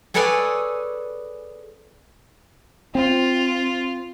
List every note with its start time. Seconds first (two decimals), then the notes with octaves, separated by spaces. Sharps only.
0.14 G#4 A4 B4 C#5 D5 G#5
2.95 C4 F4